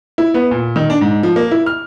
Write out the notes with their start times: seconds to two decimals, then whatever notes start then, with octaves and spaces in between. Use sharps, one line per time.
0.18 E4
0.34 B3
0.51 A#2
0.76 D#3
0.90 D4
1.01 G#2
1.23 F3
1.36 A#3
1.51 E4
1.66 F6